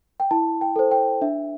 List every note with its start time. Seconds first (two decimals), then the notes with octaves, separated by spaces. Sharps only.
0.20 G5
0.31 E4 A5
0.61 G5
0.76 A4 C5
0.91 G5
1.21 D4 E5